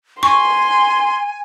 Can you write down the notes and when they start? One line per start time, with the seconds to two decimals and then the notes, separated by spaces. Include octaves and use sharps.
0.23 G#5 C6 C#6